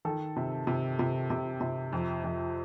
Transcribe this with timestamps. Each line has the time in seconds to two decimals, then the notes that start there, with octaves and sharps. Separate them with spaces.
0.05 D#3 A4
0.36 C3
0.67 C3
0.99 C3
1.30 C3
1.61 C3
1.93 F2
2.24 F2